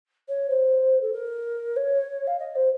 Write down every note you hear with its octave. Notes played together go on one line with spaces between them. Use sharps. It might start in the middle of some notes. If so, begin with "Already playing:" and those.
C#5
C5
A4
A#4
C#5
F5
D#5
C5